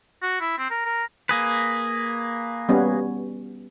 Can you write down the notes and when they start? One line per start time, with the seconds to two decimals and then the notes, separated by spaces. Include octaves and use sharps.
0.22 F#4
0.41 E4
0.58 C4
0.70 A#4
0.86 A#4
1.29 A#3 G#4 B4
2.69 G3 B3 C#4